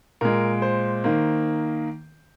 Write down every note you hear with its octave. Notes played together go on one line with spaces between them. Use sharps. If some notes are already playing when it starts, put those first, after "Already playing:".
A#2 G#3 A#4
C5
D#3 A#3